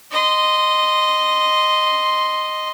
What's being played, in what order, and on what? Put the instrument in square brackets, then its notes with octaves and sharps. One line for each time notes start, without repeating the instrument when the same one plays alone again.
[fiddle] D#5 C6